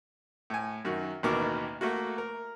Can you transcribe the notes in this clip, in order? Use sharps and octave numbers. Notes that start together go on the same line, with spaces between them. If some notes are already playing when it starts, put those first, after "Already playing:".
A2 G#5
F#2 D#3 F#4
A1 D#2 B2 A#4 D6
A3 A#3 F#4
A#4